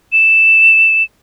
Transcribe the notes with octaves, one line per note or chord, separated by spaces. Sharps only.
E7